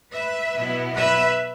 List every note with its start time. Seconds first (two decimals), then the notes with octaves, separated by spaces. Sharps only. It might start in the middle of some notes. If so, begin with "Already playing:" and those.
0.13 B4 E5
0.54 B2 F#3 B3 E4
0.95 B4 E5